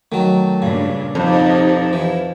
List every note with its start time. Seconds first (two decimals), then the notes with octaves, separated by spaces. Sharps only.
0.12 D#3 F#3 A3
0.62 G2 A#2 C#3 D4
1.15 F2 B2 C4 D#4 G4 A4
1.93 E3